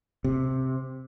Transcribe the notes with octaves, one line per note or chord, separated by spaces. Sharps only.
C3